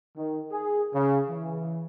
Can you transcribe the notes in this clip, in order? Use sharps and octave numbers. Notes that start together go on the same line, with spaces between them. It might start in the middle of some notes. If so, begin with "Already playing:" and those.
D#3
G#4
C#3
E3